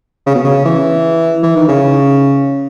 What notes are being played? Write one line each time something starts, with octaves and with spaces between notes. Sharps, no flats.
C#3
B2
C#3
E3
E3
D#3
C#3